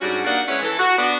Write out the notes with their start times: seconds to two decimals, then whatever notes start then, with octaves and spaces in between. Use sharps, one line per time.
0.01 G#2 G3 C#4 D4 F#4
0.25 A#3 D4 D#4 A#4 D5 F#5
0.48 G#3 C#4 E4 B4 C#5
0.63 E3 A4
0.79 F#4
0.98 B3 D4 F#4